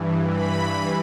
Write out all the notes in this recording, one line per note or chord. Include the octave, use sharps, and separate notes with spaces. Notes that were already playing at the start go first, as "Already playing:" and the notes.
Already playing: G2 E3
B5